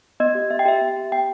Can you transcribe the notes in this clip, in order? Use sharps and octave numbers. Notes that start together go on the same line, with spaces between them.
B3 D#5
G4
B3 E5
G5
G4 E5
B3
G4
B3 G5